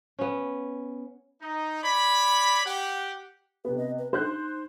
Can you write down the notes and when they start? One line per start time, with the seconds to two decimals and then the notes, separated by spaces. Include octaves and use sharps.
0.19 B3 C#4
1.42 D#4
1.83 C#5 D5 B5
2.66 G4 F#5
3.65 C3 B3 B4
3.78 D#5
3.98 B4
4.13 D#4 C5 F#6 G6